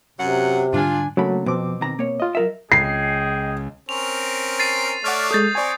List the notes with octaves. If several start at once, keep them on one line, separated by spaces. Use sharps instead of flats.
F#2 C3 F#3 F#5
G#2 D3 G3 D4 F4 G#5
C#3 F#3 A3 A#3 D4 B5
F2 B2 C4 D6
D#3 A#5
A#3 C#5
F4 D#5
F#3 A#4 E5
C#2 G#4 D#5 G5 C7
C4 C#4 A#4 F7
A6 C7 D#7
A3 C#5 D5 F#5 D6 F6
G#3 A4 D#6 G6 A6
C4 D5 G#5 C#6